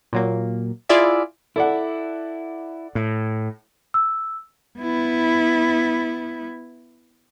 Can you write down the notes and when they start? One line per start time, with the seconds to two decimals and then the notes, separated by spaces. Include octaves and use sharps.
0.13 A#2 F#3 A#3
0.89 E4 F4 G#4 D5 E5
1.56 E4 A4 D5 F#5
2.95 A2
3.94 E6
4.79 B3 E4